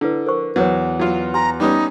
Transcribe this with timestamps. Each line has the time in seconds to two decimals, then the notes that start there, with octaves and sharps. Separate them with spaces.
0.01 D3 E4 B4
0.27 A#4 C5 C#6
0.56 E2 F#3 B4 C#5
1.00 F#3 F4
1.34 F#4 G#5 A#5 C6
1.60 G3 B3 C#4 D#4